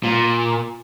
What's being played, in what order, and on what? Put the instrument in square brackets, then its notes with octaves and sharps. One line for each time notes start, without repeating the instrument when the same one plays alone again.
[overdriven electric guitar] A#2